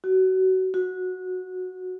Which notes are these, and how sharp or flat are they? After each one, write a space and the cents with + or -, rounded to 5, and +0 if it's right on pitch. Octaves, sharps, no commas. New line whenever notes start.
F#4 +25
F#4 -20